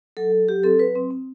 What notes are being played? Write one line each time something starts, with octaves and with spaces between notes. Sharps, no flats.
F#3 A4
F#3
F#3 G4
C4 A4
F#3 B4
C4
C4